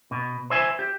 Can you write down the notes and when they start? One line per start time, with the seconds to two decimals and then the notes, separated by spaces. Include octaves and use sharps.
0.11 B2
0.50 C5 E5 G#5
0.79 G4